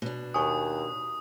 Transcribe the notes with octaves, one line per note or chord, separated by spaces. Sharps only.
B2 D4
D#2 G#5 A5 C#6 D#6